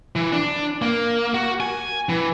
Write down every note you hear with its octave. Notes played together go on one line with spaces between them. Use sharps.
E3
D4
A#3
F#4
G#5
E3